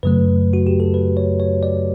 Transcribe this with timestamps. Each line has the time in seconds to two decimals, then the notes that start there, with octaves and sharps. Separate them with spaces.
0.03 F#2 C#3 F#3 A3 B4
0.53 F#4
0.67 G4
0.80 A4
0.94 B4
1.17 C#5
1.40 C#5
1.63 D5